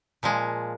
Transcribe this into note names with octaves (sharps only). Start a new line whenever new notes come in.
A#2 F3 G#3